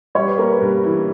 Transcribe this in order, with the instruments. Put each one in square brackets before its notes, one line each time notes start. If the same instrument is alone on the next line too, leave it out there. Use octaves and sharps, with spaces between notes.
[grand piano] G3 [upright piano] C#5
[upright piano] B4
[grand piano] A#3 [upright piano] A#4
[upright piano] B4
[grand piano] G2
E3